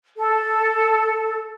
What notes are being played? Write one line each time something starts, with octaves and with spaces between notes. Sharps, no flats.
A4